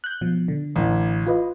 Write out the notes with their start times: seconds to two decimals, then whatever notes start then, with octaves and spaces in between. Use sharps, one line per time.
0.04 F#6 G6
0.21 B2 F3
0.48 D3
0.76 A1
1.27 F4 B4 D#5